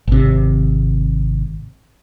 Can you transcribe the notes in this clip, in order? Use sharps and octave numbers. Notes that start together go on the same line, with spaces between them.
G#1 C3